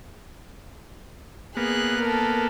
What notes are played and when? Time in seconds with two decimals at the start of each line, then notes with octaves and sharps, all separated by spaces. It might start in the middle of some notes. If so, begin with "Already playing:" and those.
1.57 A#3 B3 G#4 F#6
2.01 A4 A#4